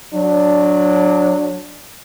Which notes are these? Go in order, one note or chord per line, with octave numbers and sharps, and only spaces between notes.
F#3 D4